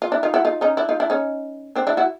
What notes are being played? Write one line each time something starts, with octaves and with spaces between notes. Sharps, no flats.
F4
D4 E4
D#4 F4
E4 F#4
D#4 F4
C#4 D#4
D4 E4
D#4 F4
D4 E4
C#4 D#4
C4 D4
D4 E4
E4 F#4